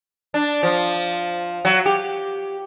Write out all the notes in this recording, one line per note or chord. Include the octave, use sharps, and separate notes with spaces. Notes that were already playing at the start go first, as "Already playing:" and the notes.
D4
F3
F#3
G4